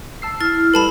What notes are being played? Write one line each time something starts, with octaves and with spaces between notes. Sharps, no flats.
A5 E6 C7
E4 F6 A6
G3 A4 B4 A5 B5